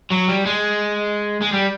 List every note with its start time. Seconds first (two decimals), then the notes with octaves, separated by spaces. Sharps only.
0.12 F#3
0.29 G3
0.46 G#3
1.41 G#3
1.53 G3